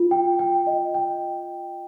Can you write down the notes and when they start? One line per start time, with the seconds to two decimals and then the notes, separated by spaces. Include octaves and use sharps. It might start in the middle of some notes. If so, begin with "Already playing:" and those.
Already playing: F4
0.11 G5
0.39 G5
0.67 D#5
0.94 G5